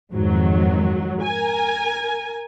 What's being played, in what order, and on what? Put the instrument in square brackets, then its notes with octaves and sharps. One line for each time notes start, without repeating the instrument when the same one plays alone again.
[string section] F2 G#2 D#3 F#3
A#4 G#5